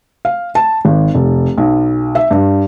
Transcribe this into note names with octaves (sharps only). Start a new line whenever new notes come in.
F5
A5
G#1
F1
B1
E5
G2